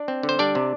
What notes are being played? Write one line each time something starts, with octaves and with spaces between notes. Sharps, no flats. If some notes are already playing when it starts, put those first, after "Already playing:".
Already playing: D4 D5
C4
D3
C5
G3 D4 D5
C3